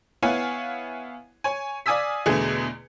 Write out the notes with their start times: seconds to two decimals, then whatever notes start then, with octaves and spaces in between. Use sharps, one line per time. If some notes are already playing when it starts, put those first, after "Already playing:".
0.22 B3 E4 C#5 F5 F#5 G#5
1.44 C#5 G#5
1.86 D5 F5 G#5 D#6 E6 B6
2.26 E2 B2 D3 A3 G#4